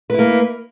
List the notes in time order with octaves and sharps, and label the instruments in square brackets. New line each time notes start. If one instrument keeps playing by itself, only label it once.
[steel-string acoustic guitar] B4
E4
A#3